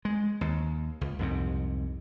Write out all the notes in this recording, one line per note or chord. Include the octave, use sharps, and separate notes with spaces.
G#3
D#2
C#2
C2 F2 G#2 C3